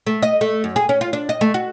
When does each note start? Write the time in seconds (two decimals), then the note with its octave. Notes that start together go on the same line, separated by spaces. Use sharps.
0.07 A3
0.22 D#5
0.41 A3
0.64 F#2
0.76 G#4
0.89 C#4
1.01 F4
1.13 D4
1.29 D#5
1.41 A3
1.54 F#4